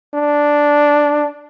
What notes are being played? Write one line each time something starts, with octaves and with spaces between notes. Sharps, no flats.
D4